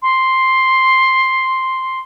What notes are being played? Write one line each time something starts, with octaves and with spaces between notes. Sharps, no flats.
C6